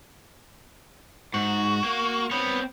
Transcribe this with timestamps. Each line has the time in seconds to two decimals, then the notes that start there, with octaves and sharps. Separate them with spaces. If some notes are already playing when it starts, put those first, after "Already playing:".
1.34 G#2 F#4
1.84 A#3
2.31 B3 C4 C#5